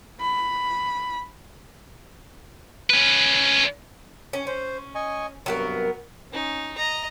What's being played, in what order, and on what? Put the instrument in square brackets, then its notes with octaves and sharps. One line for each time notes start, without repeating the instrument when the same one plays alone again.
[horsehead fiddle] B5
[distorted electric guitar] C#4 B4
[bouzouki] C#4
[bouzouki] C#4 [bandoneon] C5
[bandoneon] D#5 G#5 C#6
[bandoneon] G2 C3 [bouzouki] F#3 B3 A#4
[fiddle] C#4 D#4
D#5 A#5